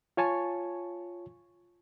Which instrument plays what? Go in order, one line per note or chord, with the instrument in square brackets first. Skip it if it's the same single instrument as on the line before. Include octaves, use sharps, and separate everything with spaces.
[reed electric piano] F4 C#5 G#5 A5 C#6